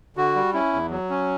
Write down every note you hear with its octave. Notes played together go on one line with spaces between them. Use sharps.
D3 F#4
G3
C#4 E4
E2
F#3
C#4